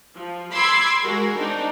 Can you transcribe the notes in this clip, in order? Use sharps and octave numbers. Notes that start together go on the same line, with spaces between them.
F3
B5 C6 D6 E6 G#6 C7
G#3 F#4 G#4 A#4
C4 D4 D#4